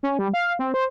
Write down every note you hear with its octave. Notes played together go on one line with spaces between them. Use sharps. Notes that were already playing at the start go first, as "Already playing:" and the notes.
C#4
G3
F5
C4
C5